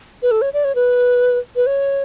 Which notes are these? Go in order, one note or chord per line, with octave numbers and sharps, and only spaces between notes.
B4
A4
C#5
D5
C#5
B4
B4
C#5